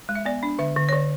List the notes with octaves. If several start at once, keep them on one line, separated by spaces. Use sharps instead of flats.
G#3
E5
B3 D5
D4
D3 E5
D3
C#5
D3 D5